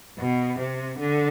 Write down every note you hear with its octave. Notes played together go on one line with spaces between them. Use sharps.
B2
C3
D3